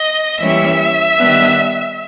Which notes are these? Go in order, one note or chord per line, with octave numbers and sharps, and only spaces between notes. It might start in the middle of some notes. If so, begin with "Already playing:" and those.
Already playing: D#5
E3 G3 A#3 C#4 E5
D#3 G3 B3 D4